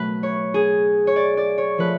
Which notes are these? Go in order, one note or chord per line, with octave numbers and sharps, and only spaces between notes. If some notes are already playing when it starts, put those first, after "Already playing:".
Already playing: B2 F#3 A3 B4
C#5
G#4
C#5
D5
D5
C#5
F3 A3 B4